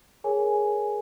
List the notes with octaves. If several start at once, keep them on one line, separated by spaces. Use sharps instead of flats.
G#4 A#4 C#5 G#5